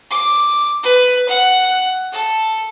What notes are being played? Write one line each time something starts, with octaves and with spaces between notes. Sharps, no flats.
D6
B4
F#5
A4